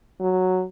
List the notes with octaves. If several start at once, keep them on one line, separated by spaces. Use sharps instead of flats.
F#3